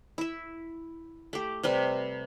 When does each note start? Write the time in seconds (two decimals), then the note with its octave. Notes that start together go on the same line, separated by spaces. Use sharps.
0.18 E4 E5
1.33 A3 G4
1.63 C3 G3 B4